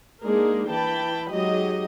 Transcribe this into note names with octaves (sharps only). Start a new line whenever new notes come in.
G#3 A#3 D4 D#4 G#4 A#4
E3 G5 A5 B5
F#3 G#3 D#4 G4 D#5